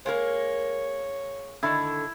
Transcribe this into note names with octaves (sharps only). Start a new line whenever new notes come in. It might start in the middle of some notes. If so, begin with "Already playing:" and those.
G#3 A#3 A#4 C#5
D3 D#3 E4